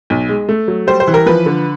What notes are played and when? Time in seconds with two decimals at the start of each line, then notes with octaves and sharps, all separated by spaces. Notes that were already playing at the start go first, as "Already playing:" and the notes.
0.10 B1
0.29 G#3
0.49 A3
0.68 F#3
0.87 G3 C5
1.00 C5
1.07 E3
1.14 A#4
1.26 F3 B4
1.46 D3